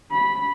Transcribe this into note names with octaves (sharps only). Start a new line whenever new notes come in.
B5